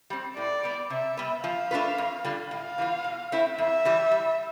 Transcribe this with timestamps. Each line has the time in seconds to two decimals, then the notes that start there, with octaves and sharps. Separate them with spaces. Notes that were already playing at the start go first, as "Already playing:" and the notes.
0.10 G3 C4
0.36 A2 D5
0.64 G3 B3
0.90 C3 E5
1.17 G3 B3
1.44 F3 F5
1.71 A3 D4 F4 B4
1.98 F2
2.24 D3 G3 D4 F4
2.51 A2 F5
2.78 E3 G3 B3 F4
3.04 B2
3.32 A3 C4 E4
3.58 F2 E5
3.85 E3 G3
4.11 G3